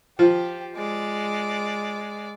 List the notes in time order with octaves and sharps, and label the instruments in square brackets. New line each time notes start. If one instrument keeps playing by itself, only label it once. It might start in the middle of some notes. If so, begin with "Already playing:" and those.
[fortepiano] F3 [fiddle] G4
[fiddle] G#3 D5